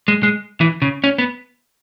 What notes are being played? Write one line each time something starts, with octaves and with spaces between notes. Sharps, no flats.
G#3
G#3
E3
C#3
C#4
B3